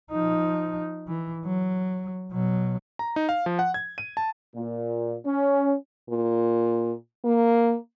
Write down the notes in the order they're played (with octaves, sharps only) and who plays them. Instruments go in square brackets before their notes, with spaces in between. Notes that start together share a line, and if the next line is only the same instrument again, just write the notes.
[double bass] F3 D#4
E3
F#3
B2 F#3
[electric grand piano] A#5
D#4
F5
F3
F#5
G#6
D#7
A5
[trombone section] A#2
C#4
[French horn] A#2
A#3